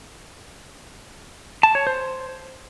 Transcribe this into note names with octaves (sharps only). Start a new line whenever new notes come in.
A5
C#5
C5